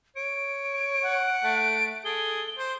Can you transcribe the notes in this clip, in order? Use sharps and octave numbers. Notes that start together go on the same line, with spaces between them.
C#5 D7
F#5
A3 D7
G#4 A4 G7
C5